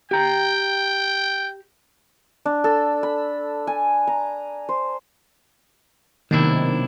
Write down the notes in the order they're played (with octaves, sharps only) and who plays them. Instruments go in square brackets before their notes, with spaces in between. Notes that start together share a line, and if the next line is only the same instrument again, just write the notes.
[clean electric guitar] G4 A#5 [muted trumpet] G5
[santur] D4
A4
B5
G#5
A#5
C5
[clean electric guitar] B1 D4 E4 [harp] C3 A#3 [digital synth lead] D#3